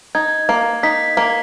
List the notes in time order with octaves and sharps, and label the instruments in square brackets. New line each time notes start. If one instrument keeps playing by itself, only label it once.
[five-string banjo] D#4 [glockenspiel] G#6
[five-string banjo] A#3
[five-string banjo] D#4 [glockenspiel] B6
[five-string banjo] A#3